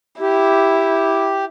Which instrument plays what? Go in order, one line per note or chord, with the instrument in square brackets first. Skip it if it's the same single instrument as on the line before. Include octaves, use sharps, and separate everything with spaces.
[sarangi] E4 [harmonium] G4